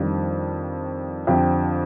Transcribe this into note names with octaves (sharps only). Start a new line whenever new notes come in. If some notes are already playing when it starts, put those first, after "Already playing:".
Already playing: F2 D#3 G3 D4
F2 D3 F3 C4 G4